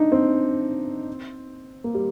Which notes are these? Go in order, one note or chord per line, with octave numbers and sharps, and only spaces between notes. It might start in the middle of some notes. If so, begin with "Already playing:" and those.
Already playing: D4 D#4
C4
A#3
G3